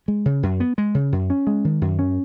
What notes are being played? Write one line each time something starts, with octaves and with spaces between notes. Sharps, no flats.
G#3
C#3
F#2
B3
G#3
C#3
F#2
C#4
G#3
D#3
F#2
C#4